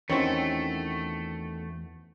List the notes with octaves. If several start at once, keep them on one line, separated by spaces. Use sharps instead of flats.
E2 D#3 A3 C4 C#4 E4 F#4